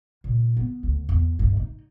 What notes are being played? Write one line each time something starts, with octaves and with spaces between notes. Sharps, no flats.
A#2
B3
D2
E2
G2
D#4